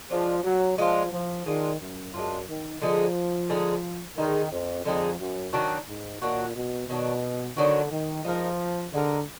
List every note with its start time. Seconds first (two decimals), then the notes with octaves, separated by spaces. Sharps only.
0.10 F3 G#3 D4 F4
0.44 F#3
0.78 F3 G#3 D4 F4
1.12 F3
1.46 D#3 G#3 D4 F4
1.81 F#2
2.14 F#2 G#3 D4 F4
2.48 D#3
2.82 D3 F3 G#3 D#4 G#4
3.49 D3 G#3 D#4 G#4
4.17 D3 D#3 G#3 D#4 G#4
4.52 F2
4.85 F2 D3 G#3 D#4 G#4
5.19 F#2
5.53 D#3 F#3 D4 F#4
5.87 G#2
6.21 A#2 D#3 F#3 D4 F#4
6.55 B2
6.89 B2 D#3 F#3 D4 F#4
7.57 D3 D#3 F#3 D4 F#4
7.91 D#3
8.25 F3 G#3 D#4 A#4
8.93 D3 G#3 D#4 A#4